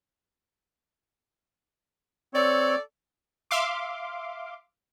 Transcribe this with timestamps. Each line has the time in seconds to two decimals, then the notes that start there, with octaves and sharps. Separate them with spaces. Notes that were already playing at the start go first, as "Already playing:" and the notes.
2.34 C4 A4 C#5 D5
3.51 E5 F5 C6 D6